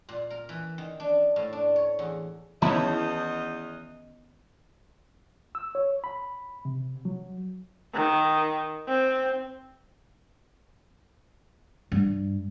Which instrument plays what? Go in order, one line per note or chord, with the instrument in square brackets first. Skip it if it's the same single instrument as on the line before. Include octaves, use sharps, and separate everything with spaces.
[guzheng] A#2
A#4
E3
D#3
D4
A2
D4
C#5
E2
[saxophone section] E2 D#5 [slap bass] D#3 B3 C#4 [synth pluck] E4 C#5 [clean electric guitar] A5
[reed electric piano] E6
C#5
B5
C3
F#3
[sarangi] D#3
C4
[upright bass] G2